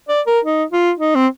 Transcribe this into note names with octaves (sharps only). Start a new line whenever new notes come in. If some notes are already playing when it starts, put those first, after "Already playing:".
D5
A#4
D#4
F4
D#4
C4